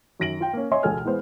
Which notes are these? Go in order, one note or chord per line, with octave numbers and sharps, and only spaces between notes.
F#2 D#3 A#6 D7 F#7
F4 G5
A#3 C#4
C#5 D#5 E5 G#5 C6
E1 C#2 G#3 A4 G#5 F6
E3 G#3 B3 C5